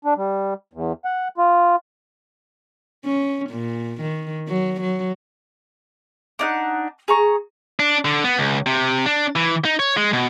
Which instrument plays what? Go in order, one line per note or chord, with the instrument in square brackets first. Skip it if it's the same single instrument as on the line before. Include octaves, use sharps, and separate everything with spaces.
[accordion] D4
G3
E2
F#5
F4
[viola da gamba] C#4
A#2
D#3
F#3
F#3
[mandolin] D4 D#4 F#5
G#4 A#5 C#6
[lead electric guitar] D4
D3
B3
C#2
C3
D4
E3
D#4
C#5
G#3
B2